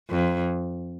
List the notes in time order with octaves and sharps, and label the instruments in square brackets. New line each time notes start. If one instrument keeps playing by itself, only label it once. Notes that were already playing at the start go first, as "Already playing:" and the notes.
[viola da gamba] F2